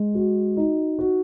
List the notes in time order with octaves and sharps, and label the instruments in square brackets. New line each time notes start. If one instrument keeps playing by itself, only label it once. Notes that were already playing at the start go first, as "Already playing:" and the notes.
Already playing: [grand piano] G#3
F#4
D#4
F#4